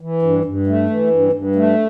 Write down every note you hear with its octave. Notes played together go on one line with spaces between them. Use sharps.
E3
G2
G2
A3
E3
G2
G2
A3